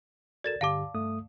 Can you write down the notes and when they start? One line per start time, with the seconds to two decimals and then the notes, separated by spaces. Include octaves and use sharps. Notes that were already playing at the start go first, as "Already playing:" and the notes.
0.44 F#4 A4 A#4 D5 A6 E7
0.61 G2 D3 G4 F5 A5 D6
0.94 G2 A3 D#6